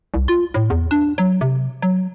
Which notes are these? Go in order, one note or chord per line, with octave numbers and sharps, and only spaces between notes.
C2
F4
A2
E2
D4
F#3
C3
F#3